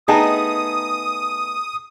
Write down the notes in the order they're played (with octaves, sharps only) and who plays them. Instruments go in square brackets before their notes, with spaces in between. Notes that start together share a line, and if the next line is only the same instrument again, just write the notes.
[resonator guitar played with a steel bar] A3 B3 D#4 [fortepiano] G#4 G5 A5 [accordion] D#6